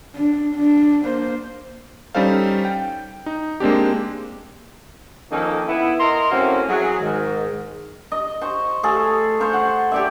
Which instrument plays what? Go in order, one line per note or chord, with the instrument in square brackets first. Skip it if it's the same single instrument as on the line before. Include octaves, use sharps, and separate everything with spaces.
[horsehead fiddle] D4
D4
A#3 C5
[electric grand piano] G3 C#4 D#4 A4 C5 F5
G5
D#4
G#3 A#3 C4 D4 G4
[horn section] D#3 F3 A#3 C#4 D#4 A4
B3 E4
A#4 D#5 A#5 C6
E3 A3 A#3 C4 C#4 F#4
F#3 G#4
G#2 D#3
[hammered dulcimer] D#5
C5 C#6
A3 G#4 A4 F5
C5 F5 C#6
F#5
G4 D5 E5